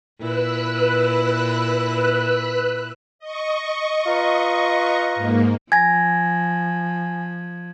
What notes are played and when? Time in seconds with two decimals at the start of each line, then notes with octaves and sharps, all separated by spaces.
0.20 A#2 E4 B4 E6 F#6
3.19 D#5 C#6
4.06 F4 B4 A#5
5.15 G#2 A#3
5.72 F3 G#5 G#6 A#6